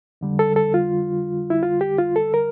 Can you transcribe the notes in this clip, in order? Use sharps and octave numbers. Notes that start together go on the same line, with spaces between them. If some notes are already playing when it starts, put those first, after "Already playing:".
F2 D3 G3
A4
A4
F4
E4
F4
G4
F4
A4
A#4